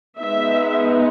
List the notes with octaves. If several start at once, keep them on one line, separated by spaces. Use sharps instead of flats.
G#3 B3 D#4 E5